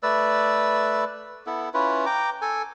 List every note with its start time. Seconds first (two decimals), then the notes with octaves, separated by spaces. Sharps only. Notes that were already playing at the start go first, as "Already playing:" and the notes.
0.03 A3 B4 D5 E6
1.46 B3 E4 A4
1.74 C#4 E4 F4 B4
2.06 G5 A#5 D6
2.42 A4 G#5